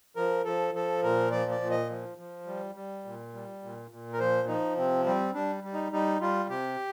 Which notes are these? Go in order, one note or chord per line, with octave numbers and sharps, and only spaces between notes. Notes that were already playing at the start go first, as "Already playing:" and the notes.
F3 A#4
F3 A4
F3 A4
A#2 A#4
F3 D5
D5
A#2
D#5
F3
F3
G3
G3
A#2
G3
A#2
A#2
A#4
F3 C5
F3 D#4
C3 C4
G3 C4
G3 D4
G3
D#4
G3 D#4
G3 F4
C3 G4